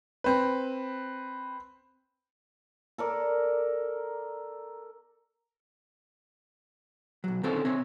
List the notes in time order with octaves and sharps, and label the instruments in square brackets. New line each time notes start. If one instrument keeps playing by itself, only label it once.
[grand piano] C4 B4
[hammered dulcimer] A4 A#4 D5
[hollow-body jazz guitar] B1 F#3
D3 D#3 C4 C#4 A4 C5
C3 C4 C#5